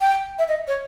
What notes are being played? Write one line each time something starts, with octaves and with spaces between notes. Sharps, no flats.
G5
E5
D#5
C#5